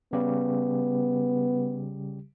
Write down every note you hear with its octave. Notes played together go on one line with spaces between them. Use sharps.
C#3 G3 B3 G4